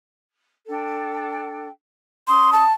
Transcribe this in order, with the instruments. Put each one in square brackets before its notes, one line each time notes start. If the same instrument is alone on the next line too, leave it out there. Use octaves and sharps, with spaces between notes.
[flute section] D4 A4 G5
[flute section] C#4 D#6 [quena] C6
[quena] A5